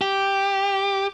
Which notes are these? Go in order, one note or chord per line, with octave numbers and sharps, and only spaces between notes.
G4